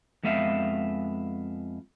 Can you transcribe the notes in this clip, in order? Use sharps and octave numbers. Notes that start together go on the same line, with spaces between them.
F2 G#3 B3 E5 F5